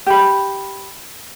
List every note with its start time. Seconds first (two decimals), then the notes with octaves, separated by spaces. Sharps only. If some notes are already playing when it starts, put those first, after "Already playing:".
0.06 G4 B5